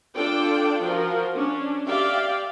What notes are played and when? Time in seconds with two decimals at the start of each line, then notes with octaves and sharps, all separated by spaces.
0.16 D4 F4 A4 D5 G5
0.82 F3 F4 F#4 A#4
1.35 C#4 D4
1.86 G4 D5 E5 F5 G5